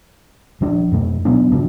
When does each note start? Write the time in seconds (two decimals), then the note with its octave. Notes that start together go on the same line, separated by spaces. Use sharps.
0.61 D#1 F3 D4
0.92 F2 B2 A3
1.25 B2 F#3 B3 D4
1.51 G#1 C#3 F3 D4